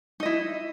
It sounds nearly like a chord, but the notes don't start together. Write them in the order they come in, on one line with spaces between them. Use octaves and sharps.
D#4 D#5 E4